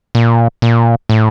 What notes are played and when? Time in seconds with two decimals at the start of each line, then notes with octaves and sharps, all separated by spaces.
0.15 A#2
0.62 A#2
1.09 A2